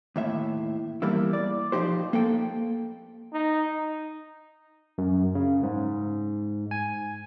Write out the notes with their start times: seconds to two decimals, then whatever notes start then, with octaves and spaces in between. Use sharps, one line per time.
0.16 D#2 A2 E5
1.02 E2 G3 A#3 E4
1.33 D5
1.72 F3 D#4 G4 C5
2.13 A#3 A4 G5
3.33 D#4
4.98 F#2
5.35 C#3
5.63 G#2
6.71 G#5